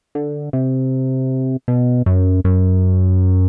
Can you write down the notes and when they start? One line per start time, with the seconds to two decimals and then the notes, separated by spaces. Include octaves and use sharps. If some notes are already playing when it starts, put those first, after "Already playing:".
0.15 D3
0.53 C3
1.68 B2
2.06 F#2
2.44 F#2